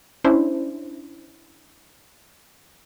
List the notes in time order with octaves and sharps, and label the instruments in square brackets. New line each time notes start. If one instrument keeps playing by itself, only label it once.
[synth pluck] C#4 D4 E4 C5